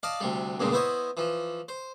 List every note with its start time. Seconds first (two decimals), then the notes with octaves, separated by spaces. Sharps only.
0.03 D5 D#5 F5 A5
0.21 D2 C3 G3
0.60 E2 G2 A#2 C#3 G#3
0.72 B3 E4 C5 C#5 D#5
1.17 E3 F3
1.69 C5